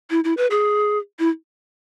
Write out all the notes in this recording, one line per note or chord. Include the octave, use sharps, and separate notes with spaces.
E4
E4
B4
G#4
E4